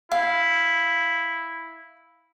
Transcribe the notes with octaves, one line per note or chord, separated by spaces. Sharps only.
E4 F5